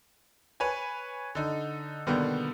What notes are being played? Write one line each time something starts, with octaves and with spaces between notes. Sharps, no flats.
B4 C#5 G#5
D3 D#4
B2 D3 D#3 G3 A#3 B3